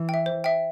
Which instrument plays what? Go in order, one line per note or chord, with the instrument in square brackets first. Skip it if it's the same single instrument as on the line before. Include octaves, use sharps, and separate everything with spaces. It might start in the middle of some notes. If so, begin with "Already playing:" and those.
Already playing: [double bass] E3
[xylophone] E5 G5
C5
E5 G5